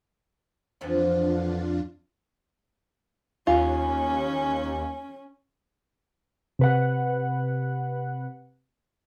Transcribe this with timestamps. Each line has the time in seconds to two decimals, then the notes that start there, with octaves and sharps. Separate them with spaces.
0.81 F2 D3 E3 F3 D4 F4
3.47 D#2 C#4 F4 G#5
6.59 C3 B4 F#5